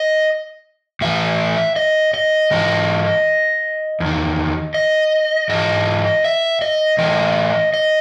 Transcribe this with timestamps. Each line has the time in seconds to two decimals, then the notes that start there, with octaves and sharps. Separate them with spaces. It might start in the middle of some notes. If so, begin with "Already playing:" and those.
Already playing: D#5
1.01 A2 E3 E5
1.76 D#5
2.14 D#5
2.51 G#2 E3 D#5
4.00 E2
4.05 D#3
4.74 D#5
5.49 G#2 E3 D#5
6.24 E5
6.62 D#5
6.98 A2 E3 D#5
7.74 D#5